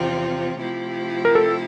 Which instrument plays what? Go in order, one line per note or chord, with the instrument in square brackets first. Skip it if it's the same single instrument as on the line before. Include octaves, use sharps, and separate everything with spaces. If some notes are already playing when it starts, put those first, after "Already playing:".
Already playing: [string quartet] E2 C3 F3 C4 F4
C3 F3 A3 E4 G4
[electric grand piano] A#4
A4